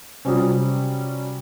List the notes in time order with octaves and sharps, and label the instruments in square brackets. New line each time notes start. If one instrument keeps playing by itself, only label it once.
[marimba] C3 F4 D#6 [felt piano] F#3 G3 C#4